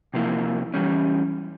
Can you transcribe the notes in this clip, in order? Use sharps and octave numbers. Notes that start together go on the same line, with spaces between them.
C3 F3 A#3 E4
E3 G3 C#4